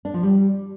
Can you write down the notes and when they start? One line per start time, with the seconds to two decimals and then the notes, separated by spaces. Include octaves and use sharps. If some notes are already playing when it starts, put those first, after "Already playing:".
0.05 D4
0.14 F3
0.23 G3